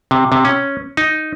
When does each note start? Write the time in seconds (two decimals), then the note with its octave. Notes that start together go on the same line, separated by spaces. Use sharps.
0.11 C3
0.32 C3
0.45 C#4
0.97 D#4